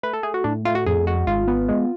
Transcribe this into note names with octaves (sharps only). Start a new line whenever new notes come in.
A3 B4
A4
A3 G#4
F#4
A2 D4
A3 F4
F#4
F2 G#4
G#3 F#4
G#1 F4
B3
G#3